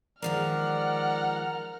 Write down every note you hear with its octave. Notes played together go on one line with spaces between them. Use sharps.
D#3 F3 G#3 A#4 D5 F#5 F6